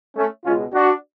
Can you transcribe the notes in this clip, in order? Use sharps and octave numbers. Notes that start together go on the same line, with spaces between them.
A3 C#4
C#2 B2 G#3 C#4 F4
D4 F#4